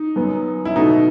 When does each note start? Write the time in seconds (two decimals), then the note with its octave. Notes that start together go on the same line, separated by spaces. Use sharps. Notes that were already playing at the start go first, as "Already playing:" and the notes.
Already playing: D#4
0.16 F#2 F#3 B3
0.65 E4
0.76 B2 A3 D#4